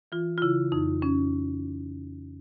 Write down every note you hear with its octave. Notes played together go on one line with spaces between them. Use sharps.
E3 F4
F4
C#3 E4
F2 D#4
F2 C#4